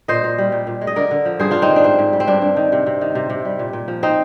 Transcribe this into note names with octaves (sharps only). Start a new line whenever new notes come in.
A#2 C5 D#5
A#2
G3
A#2
A#2
G#3
D#5
D3 A#4 D5
D3
F3
G2 G#4 C5
C4 D4 F4
C4 D#4
D#3
D4
G#2 C4
G#2
G3
C4
G2 D4
G2
D#3
C3
C3
D#3
C3
C3
G3
A#2
A#2
F3
C4 D#4